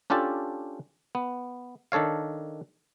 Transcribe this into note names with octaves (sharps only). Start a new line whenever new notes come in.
C#4 D4 F4 G4 A4
B3
D#3 D4 A4 C#5 F5